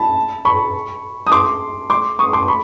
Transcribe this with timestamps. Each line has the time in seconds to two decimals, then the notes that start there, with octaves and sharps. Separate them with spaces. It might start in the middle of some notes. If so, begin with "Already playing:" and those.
Already playing: A5 B5
0.45 B5 C#6
1.27 D#6
1.32 C6 D6
1.90 C6 D6
2.19 C#6 D#6
2.33 C6 D6
2.48 B5 C#6